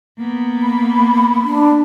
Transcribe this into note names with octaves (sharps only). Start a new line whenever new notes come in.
A#3 B3
B5
D4